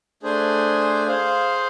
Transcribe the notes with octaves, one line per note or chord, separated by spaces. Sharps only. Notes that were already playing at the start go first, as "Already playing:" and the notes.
A3 D4 G#4 C5 G#5
G#4 C5 F5